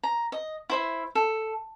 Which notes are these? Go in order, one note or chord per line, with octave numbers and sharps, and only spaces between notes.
A#5
D#5
E4 C5 E5
A4